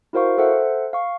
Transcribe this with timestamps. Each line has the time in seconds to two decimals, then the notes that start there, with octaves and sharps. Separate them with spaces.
0.13 E4 F#4 A#4 C5 F5 C#6
0.38 A4 C5 E5 F#5
0.93 F5 C#6